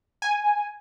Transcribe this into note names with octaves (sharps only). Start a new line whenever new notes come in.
G#5